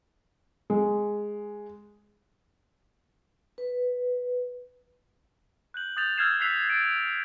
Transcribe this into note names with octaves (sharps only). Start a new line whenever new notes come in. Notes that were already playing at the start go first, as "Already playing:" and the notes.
G#3
B4
F#6 G6 F#7
D#6 G6 A6 F7
E6 F6 G6 G#6 C7 E7
E6 F#6 G6 B6 C7 F7
A6 D7